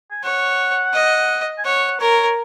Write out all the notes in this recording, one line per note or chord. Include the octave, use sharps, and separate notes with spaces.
G#5
C#5 F#5
D#5
G#5
C#5 F#5
A#4 C#5